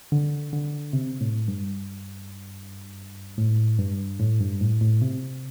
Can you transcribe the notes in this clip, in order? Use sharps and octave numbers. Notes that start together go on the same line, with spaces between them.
D3
D3
C3
A2
G2
A2
G2
A2
G2
A2
A2
C3